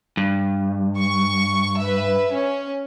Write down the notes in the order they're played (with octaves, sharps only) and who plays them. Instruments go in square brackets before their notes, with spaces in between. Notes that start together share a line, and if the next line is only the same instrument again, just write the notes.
[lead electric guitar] G2
[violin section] C#6
B4 E5
C#4